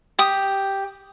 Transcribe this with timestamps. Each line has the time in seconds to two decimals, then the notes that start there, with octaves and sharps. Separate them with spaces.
0.19 G4 D#6